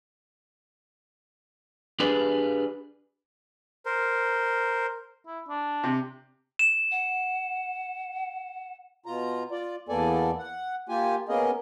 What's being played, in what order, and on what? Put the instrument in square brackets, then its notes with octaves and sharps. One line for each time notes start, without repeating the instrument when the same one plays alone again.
[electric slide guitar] D4 G4 G#4 B4 D5
[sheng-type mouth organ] A#4 C5
[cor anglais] E4
D4
[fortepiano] C3
[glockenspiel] E7
[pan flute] F#5
[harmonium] B2 F4 A#5
F4 D5
E2 A#3 B3 A4 D5 G#5
F#5
A#3 F4 G4 G#5
A#3 B3 C#4 G#4 A#4 D#5